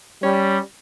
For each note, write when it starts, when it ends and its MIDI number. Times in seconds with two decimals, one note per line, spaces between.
0.23 0.58 55
0.23 0.58 61